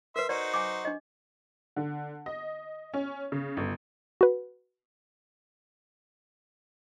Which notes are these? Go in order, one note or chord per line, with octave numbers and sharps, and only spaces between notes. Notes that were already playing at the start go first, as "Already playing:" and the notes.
A#4 B4 E5 C6
D#4 F#4 C5 D5
G#5 D6
D4 D#5
D3
D#5
C#4
C#3
G1
F#4 B4